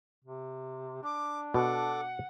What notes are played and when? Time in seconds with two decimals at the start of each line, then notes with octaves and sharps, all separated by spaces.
0.25 C3
1.03 D4 D6
1.54 B2 A4 F#5 D6